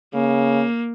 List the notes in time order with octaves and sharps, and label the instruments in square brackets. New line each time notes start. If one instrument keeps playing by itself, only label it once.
[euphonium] C#3 [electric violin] A#3